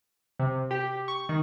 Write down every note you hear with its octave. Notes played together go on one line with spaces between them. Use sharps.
C3
G4
C#6
D#3